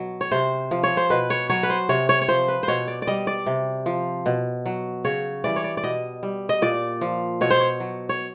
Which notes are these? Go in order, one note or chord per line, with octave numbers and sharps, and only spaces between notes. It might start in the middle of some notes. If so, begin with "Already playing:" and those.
Already playing: B2 F#3
C#5
C3 C5
F3
C#5
C5
B2 B4
C#5
F#3 C#5
B4
C5
C3 C#5
C#5
C#5
F3 C5
B4
C5
B2 C#5
D5
D5
G3 D#5
D5
C3
F3
B2
F#3
C#3 C#5
E3 G3 D5
C#5
D5
D5
B2 D#5
G3
D#5
A#2 D5
F3
B2 C#5
C5
C#5
F#3
C#5